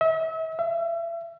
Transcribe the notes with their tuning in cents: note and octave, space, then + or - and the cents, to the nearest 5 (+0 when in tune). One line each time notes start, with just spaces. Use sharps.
E5 -40
E5 +35